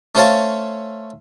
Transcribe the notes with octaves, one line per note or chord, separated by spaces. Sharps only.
A3 C#4 C5 C#5 F5 A5